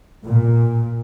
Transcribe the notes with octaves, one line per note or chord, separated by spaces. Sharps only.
A#2